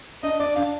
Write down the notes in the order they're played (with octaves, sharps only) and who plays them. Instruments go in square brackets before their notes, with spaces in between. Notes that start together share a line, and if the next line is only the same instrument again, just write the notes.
[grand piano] D4 [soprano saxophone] D#5
[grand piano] D4 [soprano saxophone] D5
[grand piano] D4 [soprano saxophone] F5